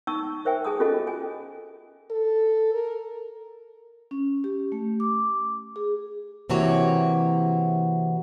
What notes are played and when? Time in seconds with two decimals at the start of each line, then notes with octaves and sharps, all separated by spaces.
0.07 D#4 A5 C#6 E6
0.45 A#4 C5 E5 G5 G#5
0.65 G#4 G#5 A5 D#6
0.80 C#4 F4 F#4 G#4 A4 D#5
1.07 G#5
2.11 A4
2.74 A#4
4.11 C#4
4.44 G4
4.72 A3
5.00 D6
5.76 G#4
6.50 C3 E3 A#3 F#4 C#5 G5